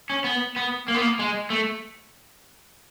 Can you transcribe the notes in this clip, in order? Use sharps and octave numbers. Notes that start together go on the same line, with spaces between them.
C#4
B3
B3
A#3
B3
A#3
G#3
A3